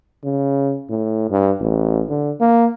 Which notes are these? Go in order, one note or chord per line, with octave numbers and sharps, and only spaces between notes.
C#3
A2
G2
A1
D3
A#3